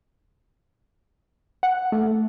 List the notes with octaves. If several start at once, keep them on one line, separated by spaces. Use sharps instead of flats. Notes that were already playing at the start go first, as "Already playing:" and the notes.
F#5
A3